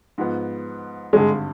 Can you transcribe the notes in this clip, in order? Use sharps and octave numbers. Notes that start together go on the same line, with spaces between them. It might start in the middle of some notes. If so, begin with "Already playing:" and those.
G#2 F3 B3
G#1 G2 D3 G#3